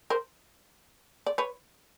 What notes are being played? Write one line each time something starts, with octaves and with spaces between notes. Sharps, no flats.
A#4 C5
D5
B4 C#5